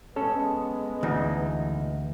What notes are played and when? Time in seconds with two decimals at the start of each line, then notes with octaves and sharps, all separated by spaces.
0.16 G#3 B3 C#4 A4 C#5
1.03 D2 E3 D#4